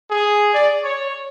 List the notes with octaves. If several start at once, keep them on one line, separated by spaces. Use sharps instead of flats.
G#4
D5
C#5